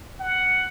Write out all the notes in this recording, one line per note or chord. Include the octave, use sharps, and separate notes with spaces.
F#5